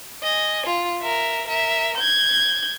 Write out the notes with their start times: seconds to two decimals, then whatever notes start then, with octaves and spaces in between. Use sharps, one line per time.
0.23 D#5 G#5
0.67 F4
1.02 A#4 E5
1.47 A#4 E5
1.97 G6 G#6